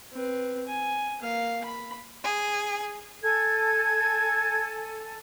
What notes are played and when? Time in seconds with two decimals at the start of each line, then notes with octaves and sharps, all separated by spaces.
0.13 C4 B4
0.67 G#5
1.21 A#3 F5
1.64 B5
2.24 G#4
3.23 A4 G#5 G#6